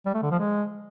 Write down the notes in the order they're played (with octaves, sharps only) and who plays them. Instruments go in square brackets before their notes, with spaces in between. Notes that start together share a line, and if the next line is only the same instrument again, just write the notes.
[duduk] G3
A3
D3
F3
G#3